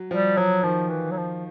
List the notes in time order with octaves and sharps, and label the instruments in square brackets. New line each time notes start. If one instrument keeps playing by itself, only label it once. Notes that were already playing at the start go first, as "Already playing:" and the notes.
Already playing: [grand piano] F#3
[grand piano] F3 [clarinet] G3
[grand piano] F3 [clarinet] F#3
[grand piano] D#3 [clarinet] F3
[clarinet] E3
F#3
F3